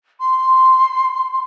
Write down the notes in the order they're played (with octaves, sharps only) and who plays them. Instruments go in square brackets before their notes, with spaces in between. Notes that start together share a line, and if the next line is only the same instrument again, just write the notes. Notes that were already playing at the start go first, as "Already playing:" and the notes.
[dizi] C6